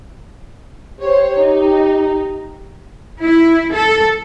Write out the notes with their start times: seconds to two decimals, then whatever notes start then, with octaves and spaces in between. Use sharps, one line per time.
1.01 G4 C5 C#5
1.38 D#4
3.23 E4
3.73 A4